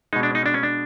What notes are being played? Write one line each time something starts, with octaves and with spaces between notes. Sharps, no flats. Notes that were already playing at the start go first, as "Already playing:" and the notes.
B2 G#3 D#4
D4
D#4
D4
C#4
D4